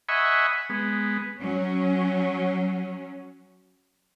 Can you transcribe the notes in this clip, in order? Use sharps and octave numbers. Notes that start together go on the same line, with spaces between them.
D#5 E5 F#5 G#5 B5 C#6
G#3 B3
F#3 C#4